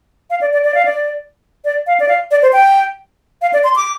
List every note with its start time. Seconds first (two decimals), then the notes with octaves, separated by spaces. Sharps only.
0.30 F5
0.41 D5
0.53 D5
0.64 D5
0.75 F5
0.85 D5
1.65 D5
1.87 F5
2.00 D5
2.08 F5
2.31 D5
2.42 C5
2.53 G5
3.42 F5
3.53 D5
3.64 C6
3.76 D6